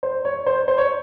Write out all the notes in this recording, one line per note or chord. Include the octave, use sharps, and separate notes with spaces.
C5
C#5
C5
C5
C#5